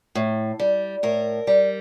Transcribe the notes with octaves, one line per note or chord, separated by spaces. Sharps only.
A2
G3
A2 A#4
G3